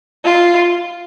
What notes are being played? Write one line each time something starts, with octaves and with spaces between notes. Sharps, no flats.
F4